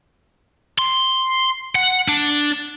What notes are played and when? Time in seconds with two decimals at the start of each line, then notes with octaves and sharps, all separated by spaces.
0.79 C6
1.75 F#5
2.08 D4